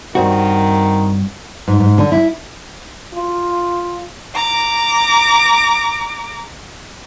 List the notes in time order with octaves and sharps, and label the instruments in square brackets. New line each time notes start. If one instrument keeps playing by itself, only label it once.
[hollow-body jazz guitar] G2 C4 F#4 [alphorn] D#3
[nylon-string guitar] G#2
G#2
D3
E4
[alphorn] F4
[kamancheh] A#5 D6